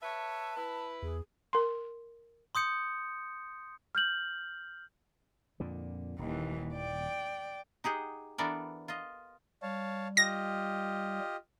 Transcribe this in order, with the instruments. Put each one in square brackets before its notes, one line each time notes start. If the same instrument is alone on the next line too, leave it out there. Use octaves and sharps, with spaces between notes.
[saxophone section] B4 C#5 E5 [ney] A5
[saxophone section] E4 B4
[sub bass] E2 [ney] G#4
[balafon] A#4 C6
[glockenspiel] C6 D#6 G6 C#7
[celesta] F6 G6 F#7
[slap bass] F2 A#2 D3
[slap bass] D#1 [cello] D#2 E3
[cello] D5 G5
[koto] D#4 G4 G#4 F#5
E3 B3 D4 A4 A#4 D5
F4 D#5
[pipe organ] G3 [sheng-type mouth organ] C#5 F5 A5
[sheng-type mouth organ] F4 G4 D#5 [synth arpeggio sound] A#6